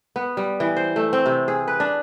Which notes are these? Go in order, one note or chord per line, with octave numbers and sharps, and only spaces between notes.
B3
G3
E3
C5
A3
C4
C3
G#4
B4
D4